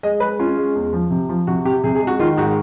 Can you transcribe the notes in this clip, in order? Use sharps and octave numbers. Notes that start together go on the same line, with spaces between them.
G#3 D#5
G#3 B4
C#4 F4
G#3
E2
F3
C3
F3
C3 F#4
C3 G4
C3 G#4
G#4
G#3
F#4
D#3 F4
G#2 F#4